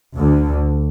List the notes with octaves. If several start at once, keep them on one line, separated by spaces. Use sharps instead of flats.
D2 D3